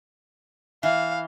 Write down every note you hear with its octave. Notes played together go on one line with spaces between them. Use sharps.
E3 F5